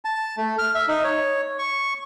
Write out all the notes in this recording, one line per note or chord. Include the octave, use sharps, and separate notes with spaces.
A5
A3
F6
E5
D#4
C#5
C#6